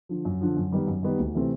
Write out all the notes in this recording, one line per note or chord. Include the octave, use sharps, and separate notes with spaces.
D3 F3
F#2
D3 F3
F#2
D#3 G3 B3 D#4
F#2
D#3 G3 B3 D#4
D2
C3 E3 A3 C4